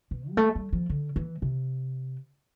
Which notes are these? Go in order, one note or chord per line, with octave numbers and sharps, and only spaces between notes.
B2
G3
A3
G3
F3
D3
E3
C3